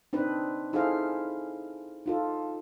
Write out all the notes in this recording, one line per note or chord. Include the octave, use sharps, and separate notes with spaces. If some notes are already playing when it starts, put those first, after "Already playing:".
C4 D4 D#4 B4
D#4 E4 G#4 A4 C5 F5
D#4 F4 A4